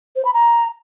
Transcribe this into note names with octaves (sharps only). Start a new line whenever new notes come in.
C5
B5
A#5